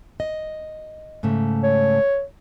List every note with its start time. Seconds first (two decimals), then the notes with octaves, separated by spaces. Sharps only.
0.20 D#5
1.23 G#2 C#3 A3
1.64 C#5